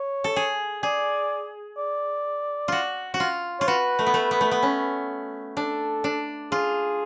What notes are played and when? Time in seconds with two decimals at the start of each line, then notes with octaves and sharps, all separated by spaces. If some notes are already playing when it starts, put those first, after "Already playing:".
Already playing: C#5
0.24 A4
0.36 G#4
0.83 G#4 D5
1.78 D5
2.68 F4 F#4
3.14 F#4
3.20 F4
3.60 F4 C#5
3.67 F#4 B4
3.99 A3
4.07 B3
4.14 A3
4.31 B3
4.41 A3
4.51 B3
4.63 C#4
5.57 D4 A4
6.04 D4
6.52 F4 G#4